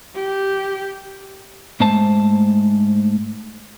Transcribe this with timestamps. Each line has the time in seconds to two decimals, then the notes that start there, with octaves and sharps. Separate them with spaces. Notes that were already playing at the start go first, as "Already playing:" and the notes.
0.14 G4
1.80 G#2 G#3 A3 C5 A5